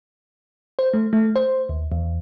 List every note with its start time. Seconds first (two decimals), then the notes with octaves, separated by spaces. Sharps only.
0.79 C5
0.94 A3
1.13 A3
1.36 C5
1.69 D#2
1.92 E2